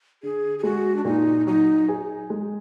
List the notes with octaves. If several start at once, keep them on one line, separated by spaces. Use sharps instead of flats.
D3 G#4
G#4
G#3 F#4
D4
A#2 D#4
F#3 D#4
G#4
G#3